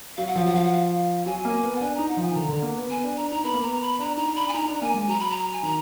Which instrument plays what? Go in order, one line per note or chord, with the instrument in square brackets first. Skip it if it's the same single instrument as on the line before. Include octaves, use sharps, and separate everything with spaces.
[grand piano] F#3 [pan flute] F5
[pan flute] F#5
[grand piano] F3 [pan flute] F5
[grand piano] F#3 [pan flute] F#5
[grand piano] F3 [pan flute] F5
[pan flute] F#5
F5
[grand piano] F#3 [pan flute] G#5
[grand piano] A#3
B3
[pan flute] F#5
[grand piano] D4 [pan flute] G#5
[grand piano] D#4 [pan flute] A#5
[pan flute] F#5
[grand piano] F3 [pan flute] G#5
[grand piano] D#3
[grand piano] D3 [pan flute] A#5
[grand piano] D3
A#3
B3
[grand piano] B3 [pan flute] G#5
[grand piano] D4
[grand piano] D4 [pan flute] A#5
[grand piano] D#4 [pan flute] A#5
[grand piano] B3 [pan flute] B5
[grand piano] A#3
[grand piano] B3 [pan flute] A#5
[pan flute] B5
[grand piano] D4 [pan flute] A#5
[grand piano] D#4 [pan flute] A#5
[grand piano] D4 [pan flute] B5
[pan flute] G#5
[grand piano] D#4 [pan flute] A#5
[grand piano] D4
[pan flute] A#5
[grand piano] A#3 [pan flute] G#5
[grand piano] G#3
[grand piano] F#3 [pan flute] A#5
[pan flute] B5
A#5
G#5
[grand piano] D#3 [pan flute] A#5